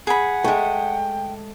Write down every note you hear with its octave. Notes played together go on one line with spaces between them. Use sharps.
G#4 F#5 B5
G#3 A3 G5